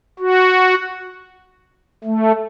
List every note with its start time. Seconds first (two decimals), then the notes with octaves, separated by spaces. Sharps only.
0.19 F#4
2.04 A3